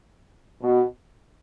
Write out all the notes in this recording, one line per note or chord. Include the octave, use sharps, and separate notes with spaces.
B2